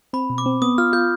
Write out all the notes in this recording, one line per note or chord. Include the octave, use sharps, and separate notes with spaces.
C4 B5
B2
D6
C4
B3 D#6
F4 F6
F4 G6